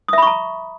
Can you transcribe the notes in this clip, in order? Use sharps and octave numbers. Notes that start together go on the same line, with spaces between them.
E5 A#5 B5 C#6 D#6